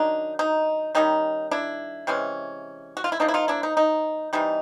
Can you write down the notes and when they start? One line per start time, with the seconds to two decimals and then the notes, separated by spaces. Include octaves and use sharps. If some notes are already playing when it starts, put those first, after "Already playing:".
Already playing: D#3 F#3 D4 D#4
0.39 D#4
0.95 D#3 G3 A#3 C#4 D#4
1.51 D4 E4
2.07 C3 E3 G#3 C#4
2.97 F#4
3.04 F4
3.12 E4
3.20 F3 A#3 D4 D#4
3.28 E4
3.34 D#4 F4
3.48 D4 E4
3.63 D#4
3.77 D#4
4.33 C3 E3 G3 D#4